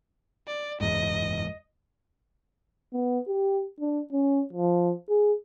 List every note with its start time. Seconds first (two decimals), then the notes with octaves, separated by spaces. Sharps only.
0.47 D5
0.81 F#1 E2 G#2 D#5
2.93 B3
3.27 G4
3.80 D4
4.12 C#4
4.53 F3
5.09 G#4